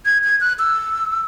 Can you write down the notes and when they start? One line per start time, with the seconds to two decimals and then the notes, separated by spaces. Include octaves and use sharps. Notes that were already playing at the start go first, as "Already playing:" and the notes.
0.06 G#6
0.24 G#6
0.41 F#6
0.59 E6